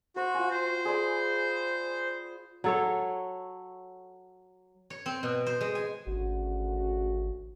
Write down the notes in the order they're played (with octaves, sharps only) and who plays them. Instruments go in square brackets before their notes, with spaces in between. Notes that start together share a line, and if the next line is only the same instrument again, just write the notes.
[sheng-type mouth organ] F#4 [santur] C5
[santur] F4 G5 G#5
[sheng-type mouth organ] C5
[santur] G#4 D5 B5
[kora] F#3 A4 C#5
[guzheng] C#5
C4
B2
C5
G#3
G#5
[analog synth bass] G#1 [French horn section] D2 C#3 F#4